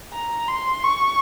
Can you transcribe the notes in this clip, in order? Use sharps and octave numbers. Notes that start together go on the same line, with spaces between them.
A#5
C6
C#6